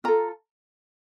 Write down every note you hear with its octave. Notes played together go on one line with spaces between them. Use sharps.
F4 A4 A#5